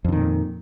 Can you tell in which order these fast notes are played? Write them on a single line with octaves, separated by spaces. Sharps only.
F2 D3 D#3 A#2